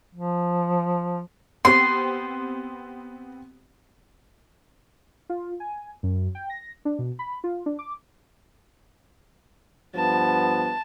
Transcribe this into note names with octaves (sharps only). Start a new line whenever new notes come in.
F3
B3 C4 G4 C6
F4
G#5
F#2
G5
A#6
D4
B2
B5
F4
D4
D6
G2 F3 B3 A5